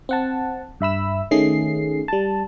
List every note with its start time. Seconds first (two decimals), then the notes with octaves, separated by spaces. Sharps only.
0.09 C4 F#5 A5
0.80 G2 E5 B5 E6
1.31 D#3 A3 C#4 G#4 C7
2.08 G3 A5